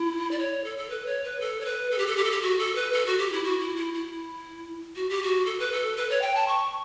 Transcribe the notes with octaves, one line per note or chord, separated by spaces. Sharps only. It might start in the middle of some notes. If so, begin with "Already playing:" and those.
Already playing: E4
D5
C#5
A4
A4
B4
C#5
B4
A4
C#5
B4
A4
G4
A4
G4
A4
G4
F#4
A4
B4
A4
F#4
G4
E4
F#4
E4
E4
E4
F#4
G4
F#4
A4
B4
A4
B4
C#5
G5
A5
C#6